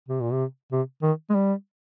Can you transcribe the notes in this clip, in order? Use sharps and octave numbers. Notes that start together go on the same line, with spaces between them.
C3
A#2
C3
C3
D#3
G#3
G3